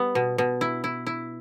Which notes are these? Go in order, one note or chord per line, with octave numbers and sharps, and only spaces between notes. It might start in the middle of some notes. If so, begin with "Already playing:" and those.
Already playing: G3 B3
B2
B2
E4
E4
E4